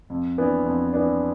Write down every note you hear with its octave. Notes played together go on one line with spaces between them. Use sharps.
F2
E3 B3 D4
F2
E3 B3 D4